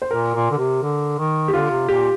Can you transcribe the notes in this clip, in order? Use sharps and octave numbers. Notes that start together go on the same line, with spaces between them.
C5
A#2 A#4
A#2
D3
C3
D3
D#3
G4
D3 F4
C3
A#2 G4